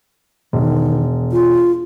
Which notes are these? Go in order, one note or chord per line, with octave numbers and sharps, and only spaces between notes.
E1 D#3
F4